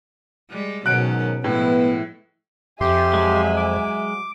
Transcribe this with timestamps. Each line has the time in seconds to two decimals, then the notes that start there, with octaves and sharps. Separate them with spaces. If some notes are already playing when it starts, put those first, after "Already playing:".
0.50 G3 G#3
0.86 G#2 B2 D#3 F#3 C#4 F#6 D7
1.44 A2 F3 G#3 B3 E4
2.81 F2 G4 E5 G#5 C6
3.14 F#3 G#3
3.57 D6